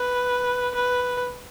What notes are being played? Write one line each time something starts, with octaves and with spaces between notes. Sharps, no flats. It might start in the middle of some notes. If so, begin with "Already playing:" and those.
Already playing: B4
B4